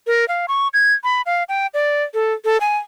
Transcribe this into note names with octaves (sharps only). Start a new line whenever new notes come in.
A#4
F5
C#6
G#6
B5
F5
G5
D5
A4
A4
G#5